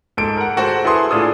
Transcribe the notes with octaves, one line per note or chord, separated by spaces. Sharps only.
G#2 A4 D7
A#4 F#5
G#3 F#4 A4 C5 F#5
E4 G#4 A4 B4 C6 D#6
A2 D4 F4 G#4 A4 D#6